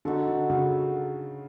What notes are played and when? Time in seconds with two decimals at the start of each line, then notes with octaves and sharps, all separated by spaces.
0.05 D3 D#4 F#4 A4
0.28 D3
0.50 C#3 D#4 F#4 A4